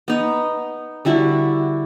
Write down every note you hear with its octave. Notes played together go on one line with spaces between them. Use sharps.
B3 D#4
D3 G3 E4 F#4